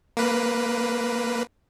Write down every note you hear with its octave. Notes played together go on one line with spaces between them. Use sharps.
A#3 B4